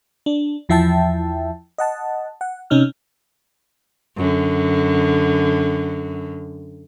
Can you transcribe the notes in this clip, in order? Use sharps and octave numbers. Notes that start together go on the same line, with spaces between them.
D4
E2 F3 E4 E5 G5 A5
D#5 F#5 A5
F#5
C3 C#4 D#4 F6
F#2 D3